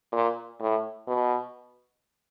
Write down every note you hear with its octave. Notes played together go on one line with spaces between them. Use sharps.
A#2
A2
B2